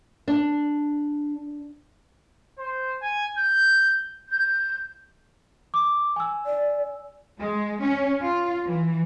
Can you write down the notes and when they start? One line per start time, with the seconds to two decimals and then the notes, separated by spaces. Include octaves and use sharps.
0.28 D4
2.58 C5
3.02 G#5
3.38 G6
4.29 G6
5.74 D6
6.16 G#5 E6
6.46 D5
7.39 G#3
7.82 C#4
8.21 F4
8.66 E3